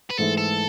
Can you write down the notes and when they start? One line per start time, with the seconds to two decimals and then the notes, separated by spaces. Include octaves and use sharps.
0.11 B4
0.18 G#2 E3 A3 E4 A4
0.38 A4